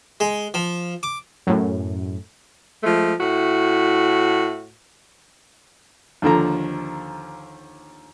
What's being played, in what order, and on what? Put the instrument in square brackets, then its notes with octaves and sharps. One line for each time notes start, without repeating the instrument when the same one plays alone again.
[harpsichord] G#3
F3
D6
[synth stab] F#2 A2
[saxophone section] F3 G#3 A3
A2 E4 F#4
[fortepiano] D#2 D3 F3 A#5